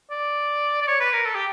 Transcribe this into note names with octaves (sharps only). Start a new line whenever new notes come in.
D5
D5
C#5
B4
A#4
A4
G4